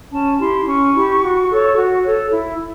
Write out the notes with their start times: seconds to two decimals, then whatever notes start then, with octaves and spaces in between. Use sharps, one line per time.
0.12 C#4 A5
0.40 E4 G4 C6
0.67 C#4 C#6
0.95 E4 G4
1.22 F#4
1.50 A4 C#5
1.77 F#4
2.04 A4 C#5
2.32 E4